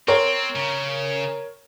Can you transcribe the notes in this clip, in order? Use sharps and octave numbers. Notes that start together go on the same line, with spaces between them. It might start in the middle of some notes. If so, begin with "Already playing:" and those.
C4 A#4 C#5
C#3